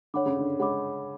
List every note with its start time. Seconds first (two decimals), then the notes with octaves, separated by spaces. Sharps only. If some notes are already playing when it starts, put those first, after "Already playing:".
0.14 D3 C#5 F#5 B5 D6
0.26 C#3
0.39 D3
0.59 G#3 C#5 F#5 B5 D6